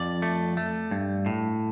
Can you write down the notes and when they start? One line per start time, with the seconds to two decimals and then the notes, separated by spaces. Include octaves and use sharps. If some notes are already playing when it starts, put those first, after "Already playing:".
Already playing: F2 D5
0.22 A3
0.57 A3
0.91 G2
1.26 A2